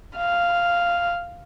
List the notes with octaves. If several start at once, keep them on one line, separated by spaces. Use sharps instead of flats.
F5